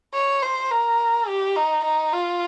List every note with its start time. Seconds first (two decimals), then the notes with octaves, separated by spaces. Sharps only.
0.14 C#5
0.42 C5
0.71 A#4
1.28 G4
1.56 D#4
1.85 D#4
2.13 F4